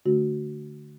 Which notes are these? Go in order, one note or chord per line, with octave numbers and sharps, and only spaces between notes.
D3 A3 D4 F#4